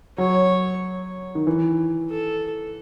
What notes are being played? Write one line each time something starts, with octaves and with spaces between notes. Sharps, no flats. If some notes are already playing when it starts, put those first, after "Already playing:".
F#3 C#5
D#3
E3
A4